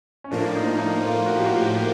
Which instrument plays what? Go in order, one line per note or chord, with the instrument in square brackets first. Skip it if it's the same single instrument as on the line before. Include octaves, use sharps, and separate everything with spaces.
[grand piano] C#4
[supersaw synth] A2 F3 A#3 [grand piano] D4
[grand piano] D#4
D#4
F4
F#4
G4
F#4
G4
F#4
G4